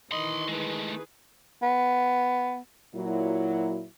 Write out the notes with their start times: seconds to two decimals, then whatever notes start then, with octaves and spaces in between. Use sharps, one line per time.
0.11 D#3 E3 D#5 B5 C6
0.49 G#3 A3 G#4 B4
1.63 B3
2.95 A#2 F#3 E4